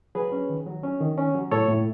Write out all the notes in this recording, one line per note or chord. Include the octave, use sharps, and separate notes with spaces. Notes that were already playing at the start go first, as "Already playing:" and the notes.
F#3 G#4 B4
C#4
D#3
F#3
C#4
D#3
C#4
F#3
A2 A4 C#5
A2